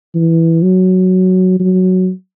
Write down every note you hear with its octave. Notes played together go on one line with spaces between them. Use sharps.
E3
F#3
F#3